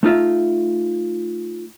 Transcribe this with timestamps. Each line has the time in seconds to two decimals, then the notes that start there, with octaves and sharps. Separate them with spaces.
0.03 A3 D#4 F4 E5